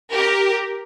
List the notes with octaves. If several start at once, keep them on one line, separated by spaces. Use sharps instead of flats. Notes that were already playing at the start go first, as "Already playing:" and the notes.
G4 A#4